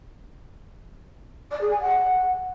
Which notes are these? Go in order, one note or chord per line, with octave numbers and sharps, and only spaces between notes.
D5
G#4
G#5
F#5